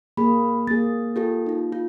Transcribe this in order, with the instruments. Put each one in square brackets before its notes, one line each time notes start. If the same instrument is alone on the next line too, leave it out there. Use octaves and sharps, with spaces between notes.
[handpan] A#3 G#4 [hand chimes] B5
[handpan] A#3 G#4 [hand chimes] A6
[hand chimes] F4 G4 A4
D#4 F4
F4